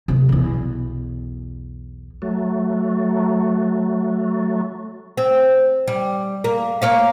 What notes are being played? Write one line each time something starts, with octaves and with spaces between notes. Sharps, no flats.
C3 A#3
B1 E2
F#3 A3
C4
G3
A#3
A#3 C#5 F5